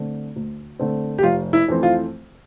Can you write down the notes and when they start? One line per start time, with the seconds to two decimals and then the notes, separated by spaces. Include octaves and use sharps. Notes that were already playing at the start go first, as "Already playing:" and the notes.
Already playing: D3 A3 C4
0.36 D2
0.79 D3 A3 C4
1.18 G4
1.23 F1 F4
1.53 E4
1.68 F2 E3 A3 C4
1.83 F4